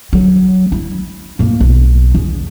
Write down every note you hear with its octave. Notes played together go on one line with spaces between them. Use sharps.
F#3
E4
A2 A#3
B1
E2